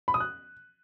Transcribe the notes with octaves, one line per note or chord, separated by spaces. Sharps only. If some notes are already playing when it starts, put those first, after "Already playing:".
B5
D#6
F#6